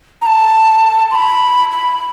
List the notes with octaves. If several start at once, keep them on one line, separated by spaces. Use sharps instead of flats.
A#5
A5
C6
B5
B5